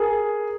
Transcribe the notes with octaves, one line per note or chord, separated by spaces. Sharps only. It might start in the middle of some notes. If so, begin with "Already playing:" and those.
Already playing: G#4 A#4